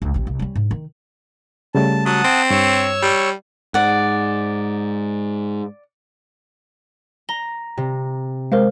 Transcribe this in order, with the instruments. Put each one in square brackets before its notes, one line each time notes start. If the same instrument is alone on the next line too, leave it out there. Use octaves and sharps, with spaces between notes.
[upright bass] C#2
A1 C4
C2
G3 C#4
G#2
D#3
[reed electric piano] C#3 G3 A3 [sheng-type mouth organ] A5
[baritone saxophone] F#3 [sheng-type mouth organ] F#5 A5 D#6
[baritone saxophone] C4
[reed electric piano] G2 [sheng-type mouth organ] C#5 C#6 E6
[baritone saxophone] G3
[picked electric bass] G#2 [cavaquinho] D5 F#5
[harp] A#5 [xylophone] G7
[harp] C3
[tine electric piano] G#3 [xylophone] A#4 C5 F5